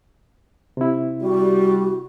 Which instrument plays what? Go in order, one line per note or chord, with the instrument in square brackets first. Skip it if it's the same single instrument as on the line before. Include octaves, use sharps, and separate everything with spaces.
[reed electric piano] C3 E4
[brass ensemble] G3 [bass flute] F#4